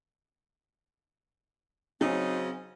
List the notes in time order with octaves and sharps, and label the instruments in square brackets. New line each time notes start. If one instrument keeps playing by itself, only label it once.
[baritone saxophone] C#3 [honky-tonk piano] F#3 [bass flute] C4 [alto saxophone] D#4